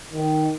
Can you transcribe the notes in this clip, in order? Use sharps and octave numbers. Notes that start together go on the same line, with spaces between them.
D#3